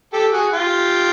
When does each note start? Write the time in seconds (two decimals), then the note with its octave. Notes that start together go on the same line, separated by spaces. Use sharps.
0.13 G4 A4
0.33 F#4 G#4
0.52 F4 G4